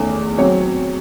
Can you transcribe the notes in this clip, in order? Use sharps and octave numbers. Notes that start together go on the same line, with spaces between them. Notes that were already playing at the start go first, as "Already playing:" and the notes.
Already playing: E2 D#3 A3 C#4
F#3 C4 C#5